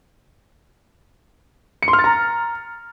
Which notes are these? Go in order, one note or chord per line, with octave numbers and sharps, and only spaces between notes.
C#7
C6
F6
A6
A#5